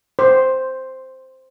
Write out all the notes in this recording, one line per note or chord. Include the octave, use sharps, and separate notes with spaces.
C5